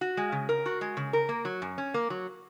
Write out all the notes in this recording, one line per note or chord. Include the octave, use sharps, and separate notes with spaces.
F#4
G#3
C#3
A#4
F#4
G#3
C#3
A#4
A#3
F#3
F#2
C#4
A#3
F#3